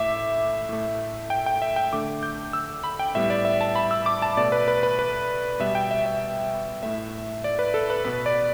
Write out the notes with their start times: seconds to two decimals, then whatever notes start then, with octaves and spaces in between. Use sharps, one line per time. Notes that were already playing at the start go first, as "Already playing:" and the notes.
Already playing: A2 A3 E5 D6
0.69 A2 A3
1.30 G5
1.46 G5
1.62 E5
1.76 G5
1.93 D3 A3 D6
2.23 G6
2.53 E6
2.84 B5
2.99 G5
3.15 A2 G3 B3 E5
3.30 D5
3.45 E5
3.61 A5
3.76 B5
3.91 E6
4.06 D6
4.22 A5
4.37 B2 A3 D5
4.52 B4
4.68 B4
4.83 B4
4.99 B4
5.59 B2 G3 B3 E5
5.75 G5
5.91 E5
6.06 E5
6.83 A2 A3 E5
7.44 D5
7.59 B4
7.74 A4
7.90 B4
8.05 B2 B3 B4
8.26 D5